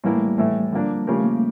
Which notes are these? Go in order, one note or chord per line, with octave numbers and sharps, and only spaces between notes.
A2 E3 G3 A#3 E4
A3
G3
A2 E3 A3
D3 F3 A#3 D4
C#3 F3 A3 C#4 G4 A#4
A#3